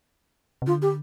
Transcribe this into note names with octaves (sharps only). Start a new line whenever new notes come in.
C3
D3 F4
G4